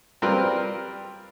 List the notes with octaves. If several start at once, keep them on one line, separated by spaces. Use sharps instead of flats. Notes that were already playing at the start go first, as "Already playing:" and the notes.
G3 C4 F4 A#4 B4